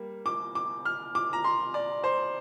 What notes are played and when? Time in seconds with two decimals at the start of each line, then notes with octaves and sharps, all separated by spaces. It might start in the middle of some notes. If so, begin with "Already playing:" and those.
Already playing: G3 A#3
0.26 D6
0.55 D6
0.85 F6
1.15 D6
1.33 A#5
1.44 C6
1.74 D5
2.04 C5